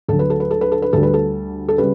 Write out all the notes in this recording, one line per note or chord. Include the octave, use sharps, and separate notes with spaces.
D2 D3 F#3 A4
B4
A4
B4
A4
B4
A4
B4
D2 D3 G3 A4
B4
A4
A4
C#3 G3 B4